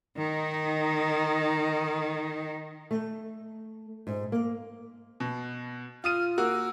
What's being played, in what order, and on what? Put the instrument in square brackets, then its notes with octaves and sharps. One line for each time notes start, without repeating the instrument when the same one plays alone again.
[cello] D#3 D#4
[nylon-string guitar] A3
G#2
A#3
[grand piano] B2
[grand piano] F4 D#6 D#7 [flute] F6
[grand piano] A#3 F#4 A#4 [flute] E6